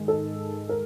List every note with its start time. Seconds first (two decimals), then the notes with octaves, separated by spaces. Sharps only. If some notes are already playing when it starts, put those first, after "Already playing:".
Already playing: G#2 D#3 G#3
0.08 A4
0.69 A#4